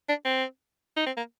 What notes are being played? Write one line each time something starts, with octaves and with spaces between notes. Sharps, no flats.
D4
C4
D#4
C4
A#3